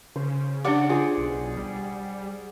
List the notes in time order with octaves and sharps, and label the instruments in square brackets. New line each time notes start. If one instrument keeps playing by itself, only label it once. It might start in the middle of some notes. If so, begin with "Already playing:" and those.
[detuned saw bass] C#3 [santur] C5
[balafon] D4 G4 D6 [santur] D5 F#5 C#6
[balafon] F4 [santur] G#4 C5
[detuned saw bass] B1
G3